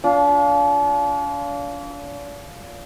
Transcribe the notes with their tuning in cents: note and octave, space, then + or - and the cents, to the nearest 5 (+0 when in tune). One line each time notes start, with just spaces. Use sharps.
D4 -40 F4 +0